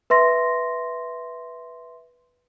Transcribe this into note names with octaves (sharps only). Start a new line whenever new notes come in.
B4 E5 C6 A#6